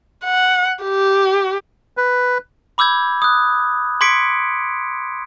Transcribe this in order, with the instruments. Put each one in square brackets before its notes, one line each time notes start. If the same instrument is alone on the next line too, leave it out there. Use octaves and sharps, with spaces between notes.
[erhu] F#5
G4
[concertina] B4
[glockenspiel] B5 D6 E6 G6 G#6
D#6 F#6
C6 D6 G#6 B6 C#7 D7